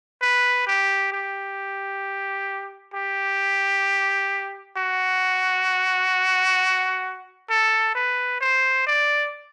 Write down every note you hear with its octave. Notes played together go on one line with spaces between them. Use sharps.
B4
G4
G4
G4
F#4
A4
B4
C5
D5